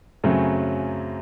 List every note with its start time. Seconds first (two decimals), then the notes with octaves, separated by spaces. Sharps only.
0.24 F#2 C#3 F#3 A3 C4